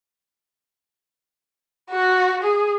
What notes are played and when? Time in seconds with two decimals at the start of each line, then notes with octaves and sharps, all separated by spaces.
1.91 F#4
2.43 G#4